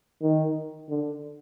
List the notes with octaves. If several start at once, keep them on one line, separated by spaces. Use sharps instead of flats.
D#3
D3